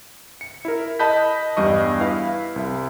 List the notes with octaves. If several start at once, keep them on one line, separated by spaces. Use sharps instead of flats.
C#7
E4 A#4
D#5 A5 B5 F#6 G6 B6
E2 G2 G3 D#5 C#6
E4 B4 F5
C2